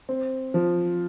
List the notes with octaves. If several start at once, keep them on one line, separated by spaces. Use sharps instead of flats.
C4
F3